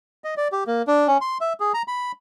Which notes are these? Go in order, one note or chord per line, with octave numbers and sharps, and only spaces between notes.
D#5
D5
G4
A#3
D4
C#4
C6
E5
G#4
A#5
B5